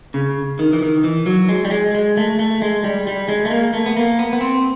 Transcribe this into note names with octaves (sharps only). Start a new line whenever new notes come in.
C#3
D#3
E3
D#3
E3
F#3
G#3
G3
G#3
G#3
A3
A3
G#3
G3
G3
G#3
A3
A#3
A3
B3
A#3
B3
B3
C4